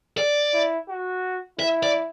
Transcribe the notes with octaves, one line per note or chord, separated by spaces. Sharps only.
D5
E4
F#4
E4 E5
D5